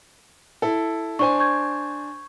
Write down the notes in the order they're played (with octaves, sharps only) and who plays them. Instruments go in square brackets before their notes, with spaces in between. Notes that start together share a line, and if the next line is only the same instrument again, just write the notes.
[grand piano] E4 A4
[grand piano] D4 C5 G#5 [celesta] C#6
[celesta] C#6 G6 G#6